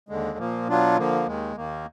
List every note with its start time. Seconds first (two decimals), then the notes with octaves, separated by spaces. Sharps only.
0.09 D#2 D3 G#3
0.38 A#2 F3 A#3
0.68 B2 F#3 D4 F4
0.97 D3 F3 A#3
1.26 D#2 D#3 G#3
1.56 D#2 D#3 A#3